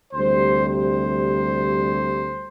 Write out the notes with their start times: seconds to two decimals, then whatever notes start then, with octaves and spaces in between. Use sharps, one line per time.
0.13 D2 C3 G3 C5
0.69 C5